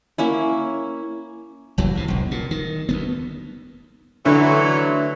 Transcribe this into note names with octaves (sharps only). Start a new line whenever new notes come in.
A#3 C#4 E4
F#1 D#2 E3 F#3
A2 C3
E1 B1
A#2
D#3
D2 F3 B3
D3 E3 F#3 A3